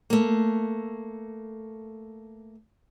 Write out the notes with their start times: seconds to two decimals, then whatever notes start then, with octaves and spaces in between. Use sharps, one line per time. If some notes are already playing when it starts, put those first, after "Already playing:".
0.10 A3 A#3